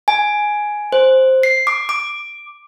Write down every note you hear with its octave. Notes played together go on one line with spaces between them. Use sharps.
G#5
C5
C7
D6
D6